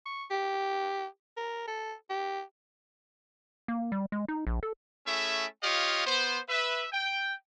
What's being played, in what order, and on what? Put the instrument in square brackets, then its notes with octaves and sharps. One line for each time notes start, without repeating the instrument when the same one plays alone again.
[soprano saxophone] C#6
G4
A#4
A4
G4
[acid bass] A#3
G3
G#3
D#4
A#1
A4
[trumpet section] A3 C#4 E4 G#4 E5
F4 G4 C#5 D#5 F5
B3 C5
B4 E5
G5